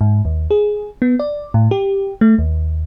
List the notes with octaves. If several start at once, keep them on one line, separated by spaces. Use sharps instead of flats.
G#2
D#2
G#4
B3
D5
A2
G4
A3
D#2